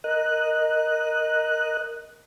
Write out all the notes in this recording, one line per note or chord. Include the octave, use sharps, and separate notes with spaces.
A#4 D#5 F#6